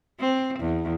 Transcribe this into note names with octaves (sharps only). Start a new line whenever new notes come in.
C4
E2